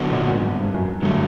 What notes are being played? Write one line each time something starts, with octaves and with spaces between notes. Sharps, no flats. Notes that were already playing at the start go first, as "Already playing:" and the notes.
Already playing: D3 F#3 B3
A#1 A#2
G#1 G#2
G2
G2
F#2
G2 D3 F#3 A3